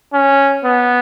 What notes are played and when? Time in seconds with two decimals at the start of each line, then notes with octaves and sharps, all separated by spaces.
0.13 C#4
0.64 B3